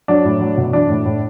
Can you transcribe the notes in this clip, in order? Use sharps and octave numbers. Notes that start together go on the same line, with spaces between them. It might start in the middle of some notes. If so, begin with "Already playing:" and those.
F#3 D4
A2
F#3
B2
E3 D4
A2
A2